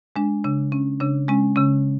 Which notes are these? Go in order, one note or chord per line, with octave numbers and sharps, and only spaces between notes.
G#3 D4
C#3 D4
C#4
C#3 D4
G#3 C#4
C#3 C#4